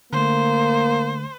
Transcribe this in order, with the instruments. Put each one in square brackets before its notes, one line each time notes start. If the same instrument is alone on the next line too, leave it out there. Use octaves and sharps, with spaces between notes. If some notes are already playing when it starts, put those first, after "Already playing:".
[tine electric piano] D3 A3 [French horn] A#3 [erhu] C5